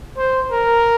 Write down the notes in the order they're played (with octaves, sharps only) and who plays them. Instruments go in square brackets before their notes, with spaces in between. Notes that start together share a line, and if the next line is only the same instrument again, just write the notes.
[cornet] C5
A#4